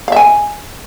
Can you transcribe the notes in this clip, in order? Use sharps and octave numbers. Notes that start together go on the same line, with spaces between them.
E5 F5 G#5